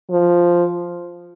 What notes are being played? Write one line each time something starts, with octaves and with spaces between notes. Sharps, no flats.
F3